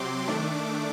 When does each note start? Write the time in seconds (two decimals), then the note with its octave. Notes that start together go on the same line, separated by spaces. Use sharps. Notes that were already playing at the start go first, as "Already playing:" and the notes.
Already playing: C3 F#3 C4 C6 D6
0.27 D#3 A3 D4